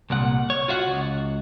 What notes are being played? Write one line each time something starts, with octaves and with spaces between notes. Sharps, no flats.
C2 A#2 F#5
C#5
F4 F#4 E5 F#5
C#2